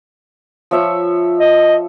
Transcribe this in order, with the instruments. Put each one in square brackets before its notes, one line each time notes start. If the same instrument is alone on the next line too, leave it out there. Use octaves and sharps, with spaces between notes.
[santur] F3 C#5 E5
[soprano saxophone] D#5